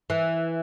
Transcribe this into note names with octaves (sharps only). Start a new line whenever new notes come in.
E3